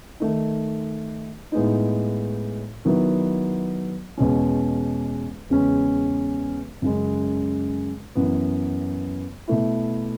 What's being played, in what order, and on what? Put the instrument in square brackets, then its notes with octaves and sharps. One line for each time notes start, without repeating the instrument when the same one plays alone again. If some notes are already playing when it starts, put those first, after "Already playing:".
[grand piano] D#3 A3 D#4
A2 G#3 B3 D#4
D#3 F#3 B3 E4
E2 B2 G#3 C#4
E2 C#3 G#3 C#4
F#2 C#3 G#3
F#2 E3 B3
B2 A3 E4